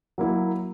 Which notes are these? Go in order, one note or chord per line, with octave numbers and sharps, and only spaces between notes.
F#3 A#3 E4